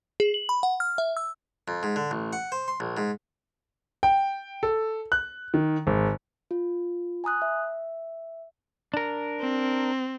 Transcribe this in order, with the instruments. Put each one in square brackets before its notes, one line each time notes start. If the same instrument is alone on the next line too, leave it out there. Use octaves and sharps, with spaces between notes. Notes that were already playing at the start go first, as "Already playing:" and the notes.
[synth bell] G#4
F#7
B5
F#5
F6
E5
E6
[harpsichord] F2
G#2
D3
A1
F#5
C5
C6
A#1
G#2
[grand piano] G5
A4
F#6
D#3
G#1
[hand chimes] F4
G#5 A#5 D#6 F#6
E5
[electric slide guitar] D4 A#4
[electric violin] C4